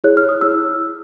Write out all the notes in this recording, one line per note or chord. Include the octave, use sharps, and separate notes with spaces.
E4 G#4 C#5 F#6
F6
D#6
E4 G#4 C#5 E6